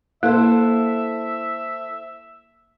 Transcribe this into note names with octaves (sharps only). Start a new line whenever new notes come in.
A#3 E4 A4 C5 E5